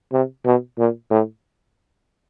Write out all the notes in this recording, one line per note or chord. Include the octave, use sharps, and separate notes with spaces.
C3
B2
A#2
A2